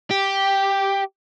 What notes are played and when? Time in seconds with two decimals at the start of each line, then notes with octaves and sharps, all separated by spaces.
0.11 G4